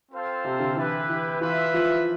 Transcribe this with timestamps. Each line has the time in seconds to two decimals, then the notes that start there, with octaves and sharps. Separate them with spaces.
0.12 C4 F4 A4 C5 F5
0.45 C3
0.60 D3
0.76 E3 E4 G4 B4
1.09 E3
1.41 E3 F4 B4 E5
1.74 F3